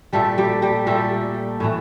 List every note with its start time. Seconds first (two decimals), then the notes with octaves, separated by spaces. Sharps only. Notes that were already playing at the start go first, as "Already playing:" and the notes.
0.13 A#2 G3 A3 A4
0.38 G3 G4
0.62 G3 G4
0.87 A#2 G3 A3 A4
1.60 A2 E3 A3